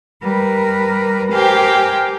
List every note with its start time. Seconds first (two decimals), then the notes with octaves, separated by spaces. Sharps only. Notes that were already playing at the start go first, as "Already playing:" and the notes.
0.23 G3 A#4 B4
1.31 G4 A#4 C5 F5 G5 G#5